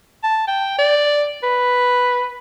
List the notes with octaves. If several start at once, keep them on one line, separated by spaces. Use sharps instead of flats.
A5
G5
D5
B4